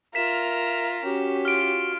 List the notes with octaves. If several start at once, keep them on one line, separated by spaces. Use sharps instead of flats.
F4 A#4 E5 B6 E7
C#4 F#4 G4
F4 F6 D7